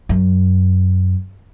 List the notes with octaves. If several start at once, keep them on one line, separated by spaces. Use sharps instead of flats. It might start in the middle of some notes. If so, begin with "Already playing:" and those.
F#2